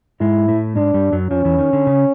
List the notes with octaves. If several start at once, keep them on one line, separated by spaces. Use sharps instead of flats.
G#2 G#3 E4
A2 A3
G#2 G#3 D4
G2 G3
F#2 F#3
F2 F3 C#4
E2 E3
D#3
D3
C#3